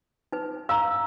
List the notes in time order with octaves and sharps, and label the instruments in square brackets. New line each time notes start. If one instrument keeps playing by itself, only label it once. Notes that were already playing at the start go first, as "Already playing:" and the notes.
[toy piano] D#4 B4
[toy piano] F5 A#5 [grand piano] E6